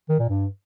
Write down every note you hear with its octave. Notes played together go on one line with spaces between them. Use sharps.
D#3
A#2
G2